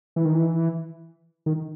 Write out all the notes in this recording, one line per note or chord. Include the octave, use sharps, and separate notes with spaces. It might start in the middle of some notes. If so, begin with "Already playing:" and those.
E3
D#3
E3
D#3